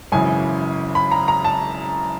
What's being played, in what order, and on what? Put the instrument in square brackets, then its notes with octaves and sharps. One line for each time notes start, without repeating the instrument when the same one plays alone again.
[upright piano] G#1 F#2 C#3 E3 G#5
B5
A#5
A#5
A5